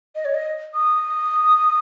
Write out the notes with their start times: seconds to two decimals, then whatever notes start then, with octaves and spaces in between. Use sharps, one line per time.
0.15 D#5
0.25 C#5
0.34 D#5
0.75 D#6